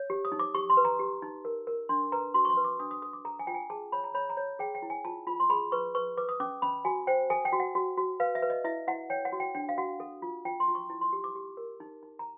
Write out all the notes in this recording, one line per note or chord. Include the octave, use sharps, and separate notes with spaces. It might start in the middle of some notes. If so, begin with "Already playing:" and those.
Already playing: C#5
G4
D#6
D#4
D6
G4 C#6
C6
B4
A#5
G4
D#4
A#4
A#4
D4 C6
B4 A#5
F#4 C6
C#6
C6
B4
D6
D4 D#6
D#6
A4 D#6
D6
A4 A#5
G#5
F4 G5
G#5
G#4 A5
C#5 B5
A#5
C#5 B5
A#5
C#5
G#4 G5
G5
E4
G#5
F4 A5
F4 B5
C6
G#4 B5
B4 C#6
B4 C#6
B4 D6
D#6
C#4 D6
C#4 B5
F#4 G#5
C5 G5
A4 G#5
G5
F#4
F#5
F#4
F#4
B4 F5
E5
B4
D#5
E4 E5
E4 F#5
C#5 G5
F#5
F#4
G5
D4 G5
F5
F#4 F#5
A4
F4
F4 G5
C6
F4
C#6
E4
C6
G4
D6
G4
A#4
D#4
D#4
A#5